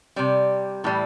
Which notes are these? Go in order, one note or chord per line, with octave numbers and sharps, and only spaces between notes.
C3 G3 D5
A2 E3 G3